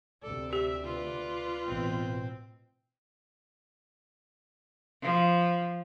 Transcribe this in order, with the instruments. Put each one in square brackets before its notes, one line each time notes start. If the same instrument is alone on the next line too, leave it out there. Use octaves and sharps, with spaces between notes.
[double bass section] D2 C3 [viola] A4 [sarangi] D5
[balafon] G4 [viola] E5
[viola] F4 B4
[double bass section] A1 B2 [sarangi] C4
[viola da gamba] F3